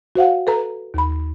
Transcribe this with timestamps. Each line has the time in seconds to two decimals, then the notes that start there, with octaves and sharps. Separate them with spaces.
0.16 F#4 C5 F5 F#5
0.47 A4 B4 A#5
0.94 D#2 B5